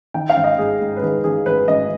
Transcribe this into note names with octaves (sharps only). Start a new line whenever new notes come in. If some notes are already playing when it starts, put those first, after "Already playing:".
D#3 G5
F5
G#1
D#5
G#2 G#4
G#2
B4
D#3 G#4
D#3 G#4
G#1 B4
G#1 D#5